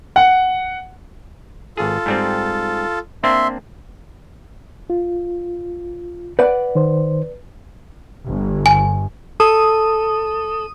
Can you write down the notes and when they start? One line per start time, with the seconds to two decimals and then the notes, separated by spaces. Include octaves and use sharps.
0.16 F#5
1.77 G#1 F4 G#4 A4
2.06 G#2 G3 C4
3.24 A#3 C4 D4 E5 C6
4.90 F4
6.39 B4 D5 F#5
6.75 D#3 C5
8.29 G1
8.66 G#5
9.40 A4 D#6